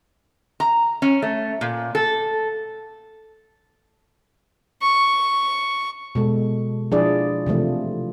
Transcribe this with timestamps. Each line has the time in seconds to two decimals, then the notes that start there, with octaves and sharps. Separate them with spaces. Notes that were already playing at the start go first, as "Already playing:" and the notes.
0.60 A#5
1.02 C#4
1.22 A3
1.61 A#2
1.95 A4
4.82 C#6
6.15 B2 G#3 A4
6.91 F3 D4 E4 G#4 D5
7.46 C3 E3 F3 A3